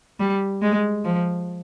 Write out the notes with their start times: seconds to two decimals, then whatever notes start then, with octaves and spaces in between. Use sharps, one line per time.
0.19 G3
0.62 G#3
1.05 F3